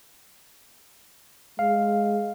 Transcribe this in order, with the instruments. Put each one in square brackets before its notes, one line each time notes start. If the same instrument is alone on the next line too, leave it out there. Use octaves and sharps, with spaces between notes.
[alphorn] G#3 [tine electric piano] F5